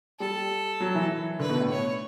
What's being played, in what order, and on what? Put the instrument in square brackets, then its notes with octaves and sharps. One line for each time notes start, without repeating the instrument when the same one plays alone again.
[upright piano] G3 [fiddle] A4
[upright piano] F#3
E3
[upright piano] D3 [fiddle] B4
[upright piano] B2
A2
[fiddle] C#5